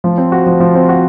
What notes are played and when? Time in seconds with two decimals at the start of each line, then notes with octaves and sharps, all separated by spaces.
0.04 F3
0.18 C4
0.32 F#4
0.46 F3
0.60 F3
0.75 C4
0.89 F#4